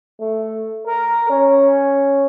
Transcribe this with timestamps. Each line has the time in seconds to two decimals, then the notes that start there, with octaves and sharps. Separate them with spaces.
0.20 A3
0.86 A#4
1.29 C#4